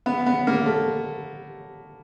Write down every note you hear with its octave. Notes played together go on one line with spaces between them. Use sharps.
B3
B3
A#3
A3